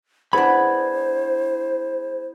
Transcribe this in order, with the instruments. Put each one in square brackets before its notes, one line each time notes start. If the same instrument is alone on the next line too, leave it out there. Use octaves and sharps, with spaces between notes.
[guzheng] B3 D4 [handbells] E4 G#4 G#6 [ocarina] C5 [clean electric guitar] B5